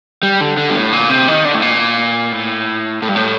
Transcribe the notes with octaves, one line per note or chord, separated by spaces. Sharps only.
G3
D3
D3
G2
A2
A#2
C3
D#3
D3
A2
A#2
A2
A2
G2
A2